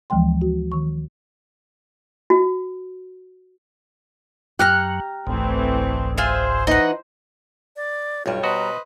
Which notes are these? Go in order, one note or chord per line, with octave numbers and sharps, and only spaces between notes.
D2 E3 F3 G#3 G5 C6
F#4
D#3 C#6
F#4
F#2 F#3 G4 A#5 F6 F#6
G1 C2 G#2 E3 A3 C4
F4 G#4 C5 E5
E3 D#4 D#5 F#5
D5
B1 G2 G3 F4 C#5
B2 F#4 B4 C5 D#5 A#5